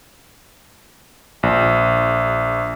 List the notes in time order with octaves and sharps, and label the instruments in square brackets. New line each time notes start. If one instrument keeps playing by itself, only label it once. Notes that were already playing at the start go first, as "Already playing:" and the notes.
[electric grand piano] A#1